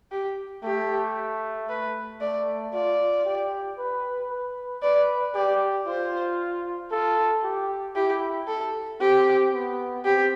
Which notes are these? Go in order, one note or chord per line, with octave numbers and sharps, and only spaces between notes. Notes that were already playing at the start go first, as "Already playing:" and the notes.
G4
A3 G4
B4
A3 D5
F4 D5
G4
B4
B4
B4 D5
G4 D5
F4 C5
F4 A4
G4
E4 G4
A4
C4 G4
B3
C4 G4